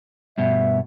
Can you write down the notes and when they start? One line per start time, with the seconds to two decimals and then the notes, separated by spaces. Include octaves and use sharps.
0.38 G2 B2 E5